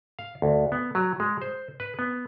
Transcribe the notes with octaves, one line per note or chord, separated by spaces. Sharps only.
F5
D2
B3
F#3
G#3
C5
B4
B3